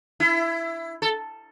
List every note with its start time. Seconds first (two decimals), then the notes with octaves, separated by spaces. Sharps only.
0.20 E4
1.02 A4